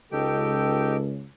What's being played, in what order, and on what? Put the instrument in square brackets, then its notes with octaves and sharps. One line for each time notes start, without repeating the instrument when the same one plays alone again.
[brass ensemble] C#2 [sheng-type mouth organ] D#4 G4 G5 [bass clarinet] A4